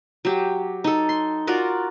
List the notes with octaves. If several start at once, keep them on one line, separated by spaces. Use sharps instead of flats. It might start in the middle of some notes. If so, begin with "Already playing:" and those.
F#3 G4
D#4 A4
C6
F4 F#4 A#4 D5